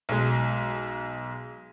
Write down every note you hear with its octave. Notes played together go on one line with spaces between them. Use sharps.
B1 G#3